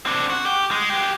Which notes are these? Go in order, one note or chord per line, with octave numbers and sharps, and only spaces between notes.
C4 D4
F#4
G4
G#3
F#3 G4